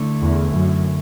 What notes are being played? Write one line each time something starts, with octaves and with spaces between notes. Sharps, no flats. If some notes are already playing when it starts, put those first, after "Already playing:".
Already playing: D3 A3 E4
E2
F#2